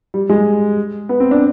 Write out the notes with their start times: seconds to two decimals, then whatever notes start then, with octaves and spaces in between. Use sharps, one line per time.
0.14 G3
0.29 G#3
1.09 B3
1.20 C4
1.31 D4